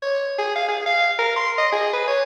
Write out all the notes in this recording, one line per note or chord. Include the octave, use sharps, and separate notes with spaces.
C#5
G#4
F5
G#4
F5
A#4
C6
D#5
G#4
B4
C#5